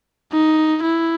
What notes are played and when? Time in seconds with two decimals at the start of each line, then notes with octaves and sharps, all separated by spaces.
0.32 D#4
0.82 E4